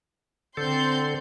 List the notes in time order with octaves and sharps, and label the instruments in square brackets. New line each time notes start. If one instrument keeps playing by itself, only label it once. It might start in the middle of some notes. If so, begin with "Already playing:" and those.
[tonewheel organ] D3 A4 [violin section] C4 C6 G6